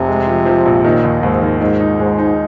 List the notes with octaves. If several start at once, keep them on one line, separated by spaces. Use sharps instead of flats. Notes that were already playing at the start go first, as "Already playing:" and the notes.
Already playing: F1 C3
G#3
F3
F3
A#1
A#2 D#3
D#2
D#2 G#2
D#3
G#2 D#3
D#4
G#2 G#3
D#4